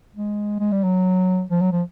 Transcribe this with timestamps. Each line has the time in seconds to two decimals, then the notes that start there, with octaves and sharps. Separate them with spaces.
0.16 G#3
0.60 G#3
0.72 G3
0.84 F#3
1.50 F3
1.61 F#3
1.72 F3